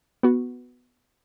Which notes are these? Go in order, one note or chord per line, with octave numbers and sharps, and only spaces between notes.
B3 F#4